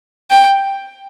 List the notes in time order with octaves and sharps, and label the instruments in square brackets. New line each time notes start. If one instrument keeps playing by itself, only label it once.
[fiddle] G5